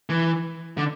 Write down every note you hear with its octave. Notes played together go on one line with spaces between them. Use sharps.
E3
D3